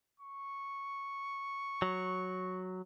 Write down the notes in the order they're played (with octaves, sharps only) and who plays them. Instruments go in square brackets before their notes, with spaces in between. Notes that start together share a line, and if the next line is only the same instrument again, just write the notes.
[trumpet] C#6
[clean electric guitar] F#3